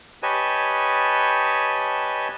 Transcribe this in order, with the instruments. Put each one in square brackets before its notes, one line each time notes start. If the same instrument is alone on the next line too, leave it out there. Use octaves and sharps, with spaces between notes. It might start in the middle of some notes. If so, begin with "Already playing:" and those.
[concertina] G4 B4 C#5 D#5 G#5 A5